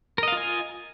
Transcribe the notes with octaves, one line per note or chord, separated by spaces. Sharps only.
F4 A#4 D#5 F5 G#5